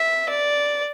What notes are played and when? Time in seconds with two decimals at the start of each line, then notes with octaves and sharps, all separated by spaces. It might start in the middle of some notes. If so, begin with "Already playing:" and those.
Already playing: E5
0.29 D5